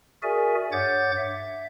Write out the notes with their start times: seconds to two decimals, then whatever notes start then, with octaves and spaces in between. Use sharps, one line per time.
0.23 F#4 G#4 A#4 D5 E5 G#5
0.72 G2 C#5 F#5 D6 G6 A6
1.17 E5